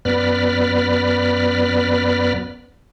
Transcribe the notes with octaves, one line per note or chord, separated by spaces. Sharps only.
F#2 B3 B4 D5 B5 F6